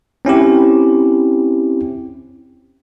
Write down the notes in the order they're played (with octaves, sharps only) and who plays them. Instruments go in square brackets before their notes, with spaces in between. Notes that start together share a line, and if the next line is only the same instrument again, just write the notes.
[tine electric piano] C4 C#4 E4 G4